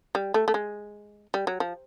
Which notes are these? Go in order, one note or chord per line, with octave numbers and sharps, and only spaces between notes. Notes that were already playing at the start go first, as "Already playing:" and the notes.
G3
A3
A3
G#3
G3
F#3
F3